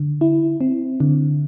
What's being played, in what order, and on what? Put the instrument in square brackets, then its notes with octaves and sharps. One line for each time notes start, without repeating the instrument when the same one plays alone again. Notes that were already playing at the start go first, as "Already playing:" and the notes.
Already playing: [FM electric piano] D3
E4
C4
D3